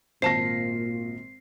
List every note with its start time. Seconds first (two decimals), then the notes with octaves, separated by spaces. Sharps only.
0.22 G#1 A#2 C5 A5 A#6 C7